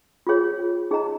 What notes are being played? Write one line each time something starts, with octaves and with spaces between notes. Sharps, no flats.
F4 G#4 C#5
D#4 G#4 D#5 A#5